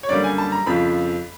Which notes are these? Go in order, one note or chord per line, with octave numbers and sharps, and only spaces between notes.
C#5
F#2 D3 G3 A#3 D5
G#5
A5
A#5
F2 C#3 F3 B5